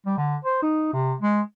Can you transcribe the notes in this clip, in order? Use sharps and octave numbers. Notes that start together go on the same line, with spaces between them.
G3
D3
C5
D#4
C3
G#3